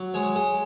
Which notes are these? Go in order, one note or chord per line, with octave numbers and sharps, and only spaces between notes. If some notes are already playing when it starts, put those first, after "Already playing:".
Already playing: F#3
G#3 C#5
G#3